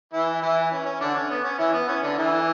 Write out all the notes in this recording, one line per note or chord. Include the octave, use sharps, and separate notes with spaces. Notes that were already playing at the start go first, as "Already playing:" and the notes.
E3 E4
E3 E4
C#4
C#4
D3 D4
C#4
B3
C#4
E3 E4
B3
C#4
D3 D4
E3 E4